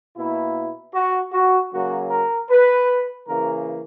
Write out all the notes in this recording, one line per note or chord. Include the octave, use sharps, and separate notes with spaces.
B2 A#3 E4
F#4
F#4
C#3 F#3 A#3 F#4
A#4
B4
C#3 E3 A#3 A#4